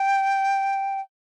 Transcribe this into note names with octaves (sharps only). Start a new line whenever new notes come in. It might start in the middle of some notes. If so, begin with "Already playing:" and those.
Already playing: G5